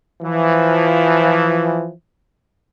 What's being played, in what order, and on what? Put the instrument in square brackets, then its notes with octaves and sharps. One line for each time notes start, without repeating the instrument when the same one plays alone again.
[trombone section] E3 F3